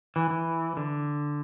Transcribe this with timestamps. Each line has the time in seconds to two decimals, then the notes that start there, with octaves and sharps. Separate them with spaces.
0.16 E3
0.31 E3
0.77 D3